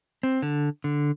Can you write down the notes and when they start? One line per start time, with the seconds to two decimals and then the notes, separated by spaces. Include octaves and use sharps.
0.23 C4
0.42 D3
0.84 D3